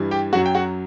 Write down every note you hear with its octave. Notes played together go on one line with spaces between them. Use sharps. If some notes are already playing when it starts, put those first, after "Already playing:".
Already playing: G2 E3 G3
G4 G5
F#2 F#3 F#4 F#5
G5
F#4 F#5